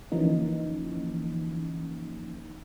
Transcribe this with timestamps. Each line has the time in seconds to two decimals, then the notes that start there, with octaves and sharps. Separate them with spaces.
0.12 D3 E3 F3 A#3 C#4 D#4